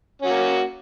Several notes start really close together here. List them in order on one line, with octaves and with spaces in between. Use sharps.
C#4 F#4 A#3